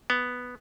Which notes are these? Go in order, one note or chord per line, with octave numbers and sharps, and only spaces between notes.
B3